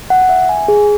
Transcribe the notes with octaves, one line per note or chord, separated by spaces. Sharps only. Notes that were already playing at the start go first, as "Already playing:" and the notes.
F#5
E5
G#5
G#4